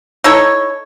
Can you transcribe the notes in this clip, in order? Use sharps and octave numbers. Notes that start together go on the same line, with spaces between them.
D#4 E4 A4 C#5